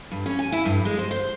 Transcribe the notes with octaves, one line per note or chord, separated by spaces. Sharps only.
G2
C#4
G#5
E4
G2
G#3
C5
C5